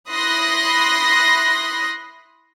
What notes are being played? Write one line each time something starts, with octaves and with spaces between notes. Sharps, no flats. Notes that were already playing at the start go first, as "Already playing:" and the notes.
E4 B5 C6 D#6 F#6 A#6